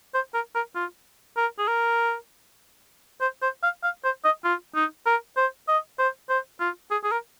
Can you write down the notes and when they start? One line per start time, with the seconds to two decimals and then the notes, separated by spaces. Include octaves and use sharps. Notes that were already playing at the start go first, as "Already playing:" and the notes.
0.14 C5
0.34 A#4
0.55 A#4
0.75 F4
1.37 A#4
1.59 G#4
1.68 A#4
3.21 C5
3.42 C5
3.63 F5
3.83 F5
4.04 C5
4.25 D#5
4.45 F4
4.75 D#4
5.06 A#4
5.37 C5
5.68 D#5
5.99 C5
6.29 C5
6.60 F4
6.91 G#4
7.04 G#4
7.11 A#4